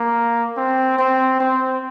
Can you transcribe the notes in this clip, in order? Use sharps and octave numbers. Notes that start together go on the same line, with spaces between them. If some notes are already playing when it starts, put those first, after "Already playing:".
Already playing: A#3
C4
C4
C4